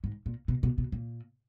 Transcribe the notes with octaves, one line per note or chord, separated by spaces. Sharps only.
G#2
A#2
B2
B2
B2
A#2